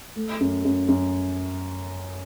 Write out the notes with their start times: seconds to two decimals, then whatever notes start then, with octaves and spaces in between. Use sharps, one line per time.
0.16 A3
0.40 F#2
0.64 F#2
0.88 F#2